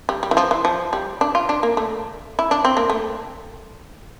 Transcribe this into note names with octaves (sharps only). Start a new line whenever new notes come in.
G3
G3
E3
F3
E3
F3
G3
D4
F4
D4
A#3
A3
E4
D4
C4
A#3
A3